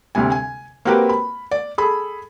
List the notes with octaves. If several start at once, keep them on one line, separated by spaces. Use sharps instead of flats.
D2 C3 G3 G#5
G#5
A#3 C4 F#4 G4 A#4 B4
B5
D5
G#4 A4 B5